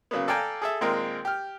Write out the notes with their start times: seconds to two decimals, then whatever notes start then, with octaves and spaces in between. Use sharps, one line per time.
0.11 C#3 F#3 A#3 B3
0.28 A4 D5 F5 G5 G#5 A#5
0.62 G#4 A4 E5
0.81 A#2 D#3 G#3 C4 A#4
1.25 G4 F6